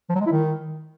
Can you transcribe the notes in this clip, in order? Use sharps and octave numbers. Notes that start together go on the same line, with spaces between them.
F3
F#3
G#3
E4
D#3